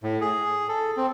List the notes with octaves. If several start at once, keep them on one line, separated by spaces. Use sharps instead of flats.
A2
G#4
A4
C4